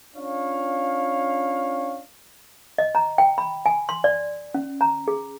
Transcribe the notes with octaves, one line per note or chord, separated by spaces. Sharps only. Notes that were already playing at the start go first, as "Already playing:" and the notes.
C#4 D4 F4 C#5 F5
D#5
A#5
G5
B5
G#5
C6
D5
C#4
A#5
G#4